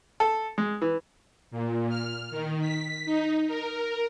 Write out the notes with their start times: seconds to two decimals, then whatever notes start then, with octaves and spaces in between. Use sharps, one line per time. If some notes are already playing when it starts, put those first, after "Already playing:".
0.20 A4
0.58 G#3
0.82 E3
1.51 A#2
1.89 F6
2.31 D#3
2.61 B6
3.06 D#4
3.48 A#4